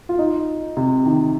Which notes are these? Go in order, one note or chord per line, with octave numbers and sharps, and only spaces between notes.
F4
D#4
C3
D#3